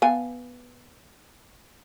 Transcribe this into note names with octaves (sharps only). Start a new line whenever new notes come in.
B3 F5 G#5